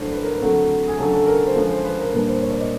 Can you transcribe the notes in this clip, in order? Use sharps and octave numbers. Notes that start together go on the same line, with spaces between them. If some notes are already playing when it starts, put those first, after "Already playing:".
Already playing: A2 F#3 A3 D4 C5
B4
A#4
B4
D3 F#3 A3 C4
G#4
C#3 F#3 A3 D4 A4
A4
A#4
C5
D3 F3 G#3 C#4 B4
C5
B4
A#4
A#2 G3 A#3 D4 B4
C5
C#5
D5
D#5